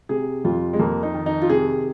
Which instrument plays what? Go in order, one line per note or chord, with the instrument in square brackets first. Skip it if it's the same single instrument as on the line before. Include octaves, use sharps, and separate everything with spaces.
[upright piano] C3 G#4
F2 F4
G#3
F2 A#3
D#4
D#3
D#4
F4
C3 G#4